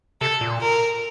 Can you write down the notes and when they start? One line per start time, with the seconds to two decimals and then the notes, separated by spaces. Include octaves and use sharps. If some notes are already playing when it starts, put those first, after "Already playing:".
0.21 C3 A4
0.41 A#2
0.61 A#4